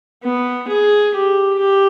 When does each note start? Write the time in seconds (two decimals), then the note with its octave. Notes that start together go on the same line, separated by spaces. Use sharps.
0.23 B3
0.68 G#4
1.14 G4
1.59 G4